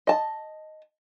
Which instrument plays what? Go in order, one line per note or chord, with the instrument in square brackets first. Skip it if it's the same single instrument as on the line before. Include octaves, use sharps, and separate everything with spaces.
[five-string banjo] D#5 A5